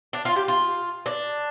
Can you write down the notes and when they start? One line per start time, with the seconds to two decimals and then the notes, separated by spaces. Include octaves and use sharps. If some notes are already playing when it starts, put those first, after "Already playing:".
0.13 D4
0.25 F4
0.36 G4
0.48 F4
1.06 D4